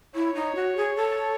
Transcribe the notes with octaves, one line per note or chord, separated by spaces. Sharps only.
E4 C#5
D#4
F#4
G#4
A4